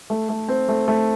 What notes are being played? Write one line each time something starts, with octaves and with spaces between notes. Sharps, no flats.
A3
A3
C4
A3
A3